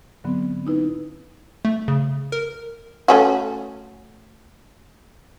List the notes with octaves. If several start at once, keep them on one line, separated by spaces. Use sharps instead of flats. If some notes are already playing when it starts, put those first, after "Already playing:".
G#2 D3 F#3 B3 C4
C#4 D#4 E4 B4
A3
C#3
A#4
A3 C#4 F#4